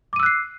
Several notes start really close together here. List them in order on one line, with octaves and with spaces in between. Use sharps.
D6 D#7 E6 F#6 C7